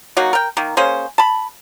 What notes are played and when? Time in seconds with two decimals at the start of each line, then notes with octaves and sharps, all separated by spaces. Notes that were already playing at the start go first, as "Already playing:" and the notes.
0.17 F#3 A#3 D#4 F#4
0.33 A#4 G5
0.57 D#3 A#3
0.77 A#3 C#4 G#4 C5
1.18 A5 B5